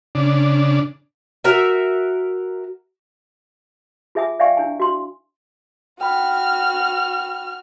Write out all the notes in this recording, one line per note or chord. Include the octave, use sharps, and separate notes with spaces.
C#3 D4
F#4 A#4 E5
F4 G#4 E5 G#5 D#6
D5 E5 F5 G5 G#5 C#6
D4 E4 G#5
F#4 C6
F#4 G5 B5 F6